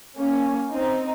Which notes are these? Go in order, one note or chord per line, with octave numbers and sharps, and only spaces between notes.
A#3 C#4
C4 D#4